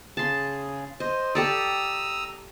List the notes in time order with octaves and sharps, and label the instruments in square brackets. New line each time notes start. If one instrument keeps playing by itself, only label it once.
[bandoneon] C#3 G#4 [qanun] A5 C6
[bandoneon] C5 [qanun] D#5
[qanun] G4 A4 D5 [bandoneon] A#5 D#6 E6